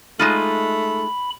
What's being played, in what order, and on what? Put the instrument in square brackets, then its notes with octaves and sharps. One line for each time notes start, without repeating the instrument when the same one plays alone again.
[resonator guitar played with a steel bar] G#3 D#4 F4 [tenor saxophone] A3 [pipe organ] B5